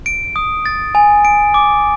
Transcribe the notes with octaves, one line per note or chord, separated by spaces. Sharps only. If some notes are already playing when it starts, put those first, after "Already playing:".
D7
D#6
A6
G#5
D7
D6